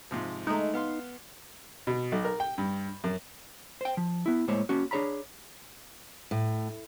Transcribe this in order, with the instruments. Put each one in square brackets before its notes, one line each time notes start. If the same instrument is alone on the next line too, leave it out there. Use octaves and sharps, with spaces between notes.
[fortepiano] G#2 C3 F3
[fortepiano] G#3 A3 [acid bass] D#4
[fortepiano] B3 F5 C6
B2
B1
A#4
G5
G2
F#2
[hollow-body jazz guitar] C5 G5
F3
B3 E4
A2 G#3 A#3 C5 C#5
A#3 C#4 F#4
D4 G#4 C#5 A#5 B5
[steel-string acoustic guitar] A2